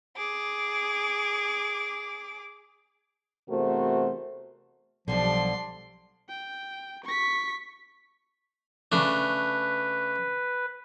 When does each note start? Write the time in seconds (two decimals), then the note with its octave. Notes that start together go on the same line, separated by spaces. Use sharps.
0.17 G#4 D6
3.49 E2 C3 A3 F#4 A#4 C5
5.08 B1 D3 F3 G3 D4 G4 C6
6.30 G5
7.04 C#6 B6
8.92 C#3 A3 D4 B4